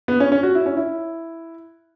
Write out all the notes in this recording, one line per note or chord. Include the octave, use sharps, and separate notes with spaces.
B3
C#4
C#4
F#4
E4
C#4
E4